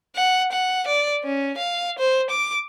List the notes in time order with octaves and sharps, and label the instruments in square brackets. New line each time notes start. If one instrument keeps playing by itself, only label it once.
[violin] F#5
F#5
D5
C#4
F5
C5
D6